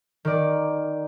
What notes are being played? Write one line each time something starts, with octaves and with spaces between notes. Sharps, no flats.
D#3 D5